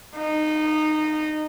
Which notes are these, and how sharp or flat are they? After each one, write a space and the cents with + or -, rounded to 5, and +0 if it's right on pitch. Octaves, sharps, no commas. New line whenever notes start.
D#4 -20